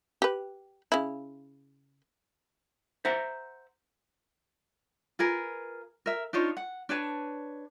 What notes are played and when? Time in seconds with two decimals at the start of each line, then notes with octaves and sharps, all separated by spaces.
0.22 G4 B4
0.92 C#3 E4
3.05 C5 E5 F#5 A#5
5.19 F4 G#4 A#4 B4
6.06 A#4 E5
6.33 D4 D#4 F4 C#5
6.57 F#5
6.89 D4 B4 C#5 A5